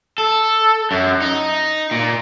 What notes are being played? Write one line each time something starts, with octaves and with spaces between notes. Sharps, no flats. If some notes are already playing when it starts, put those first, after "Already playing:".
A4
F#2
D#4
A#2